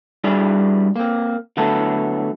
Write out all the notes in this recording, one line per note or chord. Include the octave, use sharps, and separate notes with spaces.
G3 D4 E4 F#4 G#4 D5
A#3 C4
D3 F#3 A3 B3 A4